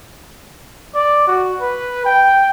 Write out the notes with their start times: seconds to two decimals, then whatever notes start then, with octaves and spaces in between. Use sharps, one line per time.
0.95 D5
1.27 F#4
1.61 B4
2.05 G5